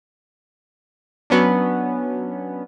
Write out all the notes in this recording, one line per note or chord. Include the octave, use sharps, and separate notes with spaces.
F#3 B3 C#4 D4